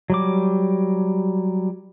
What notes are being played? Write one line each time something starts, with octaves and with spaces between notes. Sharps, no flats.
F#3 G3 D6